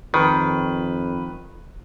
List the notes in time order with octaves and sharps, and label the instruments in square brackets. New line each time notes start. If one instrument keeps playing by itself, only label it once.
[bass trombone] F2 [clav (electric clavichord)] D#3 [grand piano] B4